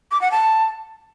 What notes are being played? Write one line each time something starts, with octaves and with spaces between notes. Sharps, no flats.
D6
F#5
A5